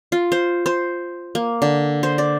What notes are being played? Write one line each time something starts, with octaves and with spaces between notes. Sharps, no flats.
F4
C5
C5
A#3
D3
C5
D5